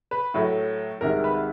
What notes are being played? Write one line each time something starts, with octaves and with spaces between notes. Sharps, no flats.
B4
A2 F#3 A3
C2 C3 D#3 G#3 A#4
B4